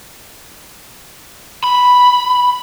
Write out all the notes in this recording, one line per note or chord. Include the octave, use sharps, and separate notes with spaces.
B5